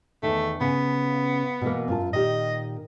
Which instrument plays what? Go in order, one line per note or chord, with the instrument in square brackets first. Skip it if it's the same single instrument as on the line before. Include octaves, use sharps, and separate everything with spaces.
[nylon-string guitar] E2 D#3 [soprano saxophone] A3
[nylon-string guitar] C#3 [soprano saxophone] B3
[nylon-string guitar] B2 E3 A#3
F#2 F4 A5
[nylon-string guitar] A#2 D#3 G4 [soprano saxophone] D#5